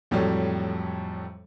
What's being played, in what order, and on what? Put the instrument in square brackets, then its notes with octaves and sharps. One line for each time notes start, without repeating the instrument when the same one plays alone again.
[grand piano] F2 A2 F#3 G3